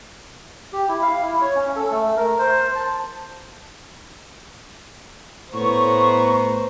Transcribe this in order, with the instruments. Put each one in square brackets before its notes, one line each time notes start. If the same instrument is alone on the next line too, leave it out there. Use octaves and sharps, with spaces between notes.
[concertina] G4
E4
F5
E4
C#5
C#4
A4
A3
A#4
C5
A5
[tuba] A2 [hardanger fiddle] B3 [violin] C5 A#5 [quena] C#6